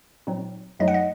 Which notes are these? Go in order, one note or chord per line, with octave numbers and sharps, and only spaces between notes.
A#2 F#3 C4 D#4
F#2 F#3 A3 D#4 D#5
F#5
D#5